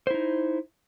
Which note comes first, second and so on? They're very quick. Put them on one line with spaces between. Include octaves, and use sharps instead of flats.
C5 E4 D#4